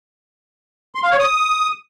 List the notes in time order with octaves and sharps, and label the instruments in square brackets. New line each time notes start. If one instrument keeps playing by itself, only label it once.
[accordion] C6
F5
C#5
D#6